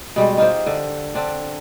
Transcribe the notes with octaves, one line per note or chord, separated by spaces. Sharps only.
B2 G3 G#3
D#4 F4 G4 C5
D3
D3 C4 D4